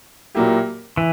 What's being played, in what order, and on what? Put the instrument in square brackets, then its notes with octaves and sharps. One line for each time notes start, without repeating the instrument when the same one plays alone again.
[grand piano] A#2 F#3 A#3 E4 G4
[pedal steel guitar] E3